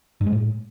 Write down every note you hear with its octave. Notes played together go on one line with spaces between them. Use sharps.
G2
G#3
A2